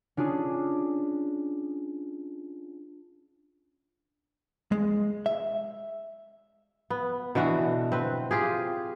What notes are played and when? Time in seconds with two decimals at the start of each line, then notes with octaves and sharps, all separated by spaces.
0.17 C#4 D4 F4 G#4
4.72 G#3
5.26 E5
6.90 B3
7.35 B2 D3 E3 F#4
7.92 C4 B4
8.31 F4 G4 G#4